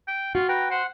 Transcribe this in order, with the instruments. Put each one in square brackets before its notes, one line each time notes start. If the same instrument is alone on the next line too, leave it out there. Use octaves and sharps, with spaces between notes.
[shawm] G5
[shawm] F4 [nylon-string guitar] F#4
[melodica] B4 G5 [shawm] A#5
[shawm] C5 [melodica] F#5